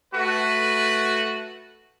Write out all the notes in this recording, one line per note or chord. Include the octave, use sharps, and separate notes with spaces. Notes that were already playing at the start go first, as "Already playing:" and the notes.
A3 F#4 B4